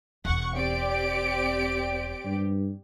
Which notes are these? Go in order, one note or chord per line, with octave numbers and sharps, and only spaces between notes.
E1 E2 F#5 C#6
C4 G4 D5 D7
G2